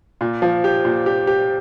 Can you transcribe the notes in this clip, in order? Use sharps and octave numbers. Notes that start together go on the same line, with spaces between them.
A#2
F3
G4
A#2
G4
G4